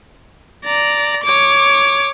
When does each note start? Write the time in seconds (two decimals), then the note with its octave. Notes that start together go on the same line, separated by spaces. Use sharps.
0.65 D5 A#5
1.24 C#5 D6